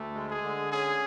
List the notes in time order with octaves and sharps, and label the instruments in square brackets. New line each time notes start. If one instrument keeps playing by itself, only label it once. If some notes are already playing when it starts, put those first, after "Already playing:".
Already playing: [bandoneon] D2 [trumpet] A3
[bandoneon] G#3
[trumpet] G#4
[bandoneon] D3
[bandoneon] C#4 [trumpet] G#4